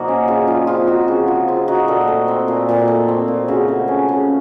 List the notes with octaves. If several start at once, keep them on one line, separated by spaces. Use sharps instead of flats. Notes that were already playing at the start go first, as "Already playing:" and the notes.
Already playing: A#2 F3 A#3 D#4 F#4
C#4
C#3 F4
F3 F4
C4 F4
D#4 F#4
C#3 F#4
F3 F4
C4 F4
D#4 F#4
A#2 A4
A3
C4
A#2
A#2
A3
C4
A#2
C#3 F#4
A3
C#4
C#3